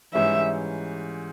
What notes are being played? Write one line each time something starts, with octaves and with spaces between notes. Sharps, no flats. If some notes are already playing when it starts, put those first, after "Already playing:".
G#2 E3 G3 C#4 E5